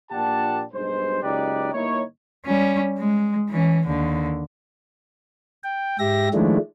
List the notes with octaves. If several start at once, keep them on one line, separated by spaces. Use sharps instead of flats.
A#1 A#2 D4 G4 F#5 A5
B1 G2 B2 G#3 C5
F#1 C#2 D#4 G4 B4 D5
G1 A#3 D#4 E4 C#5
G3 C#4
G#3
E3 C#4
D#2 D3
G5
G#2 G4 E5 A#6
D#3 F3 G#3 A3 D4 E4